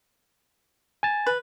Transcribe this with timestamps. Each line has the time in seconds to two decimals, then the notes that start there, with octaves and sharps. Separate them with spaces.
1.03 G#5 A6
1.26 B4